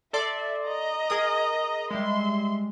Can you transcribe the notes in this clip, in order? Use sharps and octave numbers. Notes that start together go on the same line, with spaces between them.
A4 D5 E5 C6
D#5 A#5
G#4 A#4 D#6
G3 G#3 E5 C6